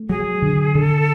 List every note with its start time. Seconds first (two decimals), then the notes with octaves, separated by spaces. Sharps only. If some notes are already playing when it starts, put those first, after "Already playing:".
Already playing: A3
0.09 F#3 G#4
0.42 D3
0.74 D3 A4